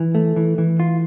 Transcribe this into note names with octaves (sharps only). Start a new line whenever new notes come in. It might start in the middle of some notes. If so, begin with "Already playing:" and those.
Already playing: E3
A3
E3
E3
F4